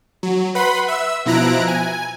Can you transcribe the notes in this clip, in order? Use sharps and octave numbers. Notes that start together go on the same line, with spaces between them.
F#3
B4 F#5 B5 C6
E5 E6
B2 F3 E4 A#5 F#6 D7
G#5